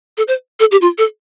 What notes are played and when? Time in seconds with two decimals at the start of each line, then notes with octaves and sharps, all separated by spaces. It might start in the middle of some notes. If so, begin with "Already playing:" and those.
0.18 A4
0.28 C5
0.60 A4
0.72 G4
0.81 F4
0.98 A4